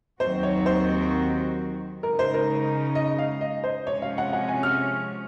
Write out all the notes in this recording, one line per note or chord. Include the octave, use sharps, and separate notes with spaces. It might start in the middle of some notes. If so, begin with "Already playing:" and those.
D#2 D#3 F#3 C4 F#4 C5
C#5
C5
C#3 G#3 D#4 A#4
C5
A#4
D#5
F5
D#5
C5
C3 F3 G#3 C#4 C#5
F5
F#5
F#5
G#5
F6